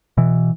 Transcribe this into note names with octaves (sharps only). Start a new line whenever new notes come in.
B2 E3